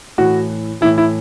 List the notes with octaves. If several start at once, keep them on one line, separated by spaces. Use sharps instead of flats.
A2 E3 F#4
A2 E3 E4
E4